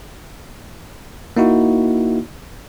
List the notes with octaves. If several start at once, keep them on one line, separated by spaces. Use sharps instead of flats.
A#3 D#4 E4 F#4